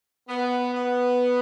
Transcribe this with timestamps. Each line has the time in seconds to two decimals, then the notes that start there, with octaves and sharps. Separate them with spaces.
0.28 B3
0.74 B3